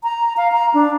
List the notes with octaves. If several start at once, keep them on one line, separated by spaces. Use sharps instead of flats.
A#5
F5
A#5
D4